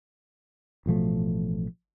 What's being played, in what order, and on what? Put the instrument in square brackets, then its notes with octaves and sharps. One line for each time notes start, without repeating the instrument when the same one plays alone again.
[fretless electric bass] A1 B2 F3 A3